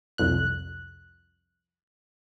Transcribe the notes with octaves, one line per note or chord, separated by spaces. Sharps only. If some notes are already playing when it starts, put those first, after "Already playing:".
C2 F2 F#6